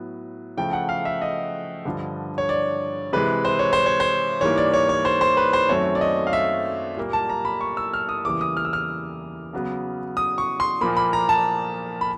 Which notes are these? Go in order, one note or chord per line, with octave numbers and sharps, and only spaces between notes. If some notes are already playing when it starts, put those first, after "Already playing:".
Already playing: A2 F#3 B3
C#3 F3 A3 G5
F#5
F5
E5
D#5
G2 D3 F3
C#5
D5
C3 E3 G#3 B4
C5
C#5
C5
C#5
C5
G#2 E3 G3 A#3 C#5
D5
C#5
C#5
C5
C5
B4
C5
F#2 D#3 F#3 A3 C4 C#5
D5
D#5
F5
E5
A#2 G3 A#3
A5
A#5
B5
C#6
E6
F6
D#6
E2 C#3 E3 G3 A#3 D6
D#6
F6
E6
F6
C#3 F#3 B3
D#6
C#6
C6
A#2 F3 A#3 B5
B5
A#5
A5
B5